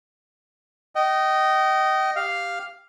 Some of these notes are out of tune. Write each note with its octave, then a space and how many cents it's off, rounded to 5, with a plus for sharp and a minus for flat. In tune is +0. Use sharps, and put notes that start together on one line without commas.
D#5 +0 G5 -35
G4 +0 F5 +0